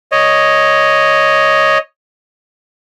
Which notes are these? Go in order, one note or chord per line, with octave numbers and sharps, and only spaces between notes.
C#5 D#5